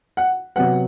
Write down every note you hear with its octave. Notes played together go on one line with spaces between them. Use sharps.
F#5
C3 F#3 B3 F#5